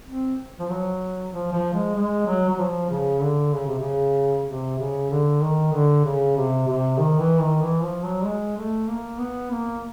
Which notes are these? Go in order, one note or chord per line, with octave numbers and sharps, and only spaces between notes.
C4
F3
F#3
F3
F3
G#3
G#3
F#3
F#3
F3
C#3
D3
C#3
C3
C#3
C3
C#3
D3
D#3
D3
C#3
C3
C3
D#3
E3
D#3
E3
F3
F#3
G#3
A3
A#3
B3
A#3